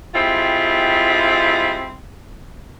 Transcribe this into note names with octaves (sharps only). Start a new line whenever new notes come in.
G3 G#3 C4 E4 F4